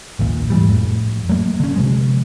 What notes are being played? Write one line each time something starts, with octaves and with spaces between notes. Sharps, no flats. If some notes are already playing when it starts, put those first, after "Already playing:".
A#1 D#2 A#2
G#2 E3 G3
F2 A2
F#3 A3 A#3
D3 C#4
C3 F3 G#3